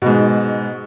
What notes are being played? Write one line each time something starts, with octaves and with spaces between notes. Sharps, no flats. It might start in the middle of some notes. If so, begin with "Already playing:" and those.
G#2 B2